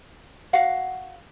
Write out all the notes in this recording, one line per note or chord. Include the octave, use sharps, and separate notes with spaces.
F#4 F5 F#5